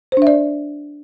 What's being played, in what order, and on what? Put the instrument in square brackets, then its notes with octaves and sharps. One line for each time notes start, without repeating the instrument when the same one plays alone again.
[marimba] C5
D4
E5
D5